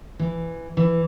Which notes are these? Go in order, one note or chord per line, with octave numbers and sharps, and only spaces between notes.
E3
E3